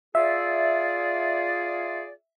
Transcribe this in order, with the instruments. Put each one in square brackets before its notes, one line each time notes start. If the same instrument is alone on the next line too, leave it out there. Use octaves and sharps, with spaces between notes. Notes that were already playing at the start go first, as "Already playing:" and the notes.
[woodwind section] F4 G#4 D5 [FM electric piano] E5